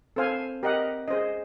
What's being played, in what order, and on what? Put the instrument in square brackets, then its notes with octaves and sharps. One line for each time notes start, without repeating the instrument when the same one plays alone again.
[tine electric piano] C4 [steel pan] A4 C5 F5 G#5
[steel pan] G4 A#4 D#5 F#5
[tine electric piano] C#4 [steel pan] G#4 C5 D#5